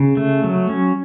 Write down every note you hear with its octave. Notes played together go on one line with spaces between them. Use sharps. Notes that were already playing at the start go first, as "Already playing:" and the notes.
Already playing: C#3
A3
F#3
C#4